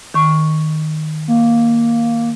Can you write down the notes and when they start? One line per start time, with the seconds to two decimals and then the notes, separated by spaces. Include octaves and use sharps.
0.14 D#3 C#6
1.28 A#3